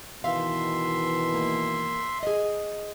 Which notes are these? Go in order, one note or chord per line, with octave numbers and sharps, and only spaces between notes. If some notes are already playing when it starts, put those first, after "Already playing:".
B2 D#3 E3 E5 F5 C6
A#3
G#4 D#5